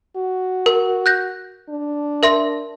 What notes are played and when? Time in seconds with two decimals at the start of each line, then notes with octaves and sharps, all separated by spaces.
0.17 F#4
0.66 A#4
1.06 F#6 G6 A#6
1.70 D4
2.23 A#4 E5 C6